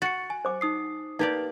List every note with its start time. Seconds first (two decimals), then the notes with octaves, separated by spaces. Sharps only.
0.02 F#4 A6 C#7
0.30 G#5
0.45 C5 D6
0.61 D#4 D#6 C7
1.19 A#3 D#4 G4 B4 D5